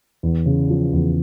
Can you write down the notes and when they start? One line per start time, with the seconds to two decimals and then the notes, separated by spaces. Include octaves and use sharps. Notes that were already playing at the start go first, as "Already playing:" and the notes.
0.23 E2
0.46 C#3
0.70 F3
0.93 E2